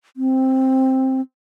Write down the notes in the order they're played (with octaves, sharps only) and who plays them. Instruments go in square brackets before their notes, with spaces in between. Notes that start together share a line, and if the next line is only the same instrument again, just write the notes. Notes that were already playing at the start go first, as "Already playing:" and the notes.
[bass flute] C4